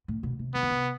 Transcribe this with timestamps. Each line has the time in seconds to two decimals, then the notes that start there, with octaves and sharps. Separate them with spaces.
0.08 A2
0.23 B2
0.39 C3
0.54 C3 B3
0.63 D3
0.70 C3